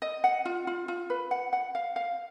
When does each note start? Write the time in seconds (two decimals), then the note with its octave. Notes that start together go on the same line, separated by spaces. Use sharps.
0.02 D#5
0.24 F#5
0.45 F4
0.67 F4
0.88 F4
1.10 B4
1.31 F#5
1.53 F#5
1.75 F5
1.96 F5